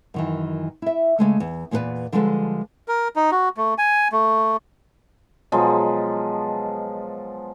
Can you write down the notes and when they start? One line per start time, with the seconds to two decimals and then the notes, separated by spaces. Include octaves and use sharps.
0.14 F#2 D#3 E3
0.82 E4 E5
1.19 C#3 E3 G#3 A3
1.40 E2
1.71 E2 A#2 B3 G#4 B4 D5
2.12 D3 F3 G3 G#3 A4 B4
2.88 A#4
3.16 D#4
3.32 F#4
3.57 A3
3.78 G#5
4.12 A3
5.52 B2 F3 F#3 G#3